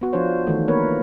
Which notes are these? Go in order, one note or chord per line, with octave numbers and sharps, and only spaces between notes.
B3 F#4
F3 D4 F4 C5 C#5
D#3 E3 A3
A#3 B3 A#4 B4 C#5